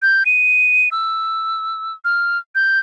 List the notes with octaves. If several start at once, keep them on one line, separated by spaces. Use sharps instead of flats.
G6
D#7
E6
F6
G6